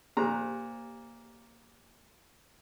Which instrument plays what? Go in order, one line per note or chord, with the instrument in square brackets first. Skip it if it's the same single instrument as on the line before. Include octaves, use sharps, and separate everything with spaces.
[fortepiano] A#2 A#5 [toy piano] G4 C5